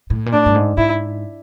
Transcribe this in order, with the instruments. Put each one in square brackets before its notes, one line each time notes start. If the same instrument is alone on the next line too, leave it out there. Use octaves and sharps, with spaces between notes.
[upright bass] A2
A#2
[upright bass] A2 [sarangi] D4
[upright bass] G2
G#2
[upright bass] G#2 [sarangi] E4